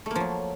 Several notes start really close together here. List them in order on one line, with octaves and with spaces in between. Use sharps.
A3 A#3 F3 F#3